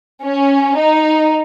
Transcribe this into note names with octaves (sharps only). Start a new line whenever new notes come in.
C#4
D#4